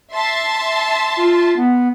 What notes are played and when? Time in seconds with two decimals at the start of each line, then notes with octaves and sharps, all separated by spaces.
0.14 E5 A5 C6
1.17 F4
1.56 B3